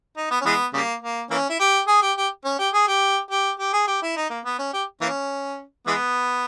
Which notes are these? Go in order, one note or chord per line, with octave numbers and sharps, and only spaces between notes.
D#4
B3
C#4
E3 G#3 B3
C#3 G3 A#3
A#3
E3 A#3 C#4
E4
G4
G#4
G4
G4
C#4
G4
G#4
G4
G4
G4
G#4
G4
E4
D#4
A#3
B3
C#4
G4
E3 A#3 C#4
E3 G#3 B3